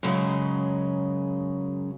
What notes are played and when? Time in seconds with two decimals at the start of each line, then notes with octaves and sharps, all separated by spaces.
0.03 F#2 C#3 F#3 G#3